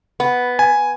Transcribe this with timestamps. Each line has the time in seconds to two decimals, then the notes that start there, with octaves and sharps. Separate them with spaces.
0.20 B3
0.59 G#5